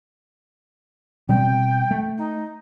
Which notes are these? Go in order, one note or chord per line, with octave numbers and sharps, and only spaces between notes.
B2 G3 C4 G5
A3
D#4